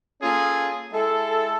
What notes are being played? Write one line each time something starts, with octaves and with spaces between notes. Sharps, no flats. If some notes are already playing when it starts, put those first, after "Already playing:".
A#3 C#4 F4 G#4 A4
G#3 E4 A4